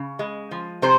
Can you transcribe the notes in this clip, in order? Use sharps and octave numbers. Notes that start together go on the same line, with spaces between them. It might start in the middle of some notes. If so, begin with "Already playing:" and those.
Already playing: C#3
G#3
F3
C3 C5